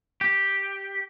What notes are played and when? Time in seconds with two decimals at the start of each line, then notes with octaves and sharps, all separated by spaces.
0.21 G4